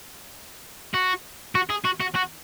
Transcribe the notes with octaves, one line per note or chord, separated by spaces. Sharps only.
F#4
F#4
G#4
F#4
F#4
F#4